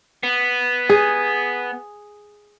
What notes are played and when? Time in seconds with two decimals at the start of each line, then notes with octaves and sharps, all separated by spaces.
0.23 B3
0.89 G#4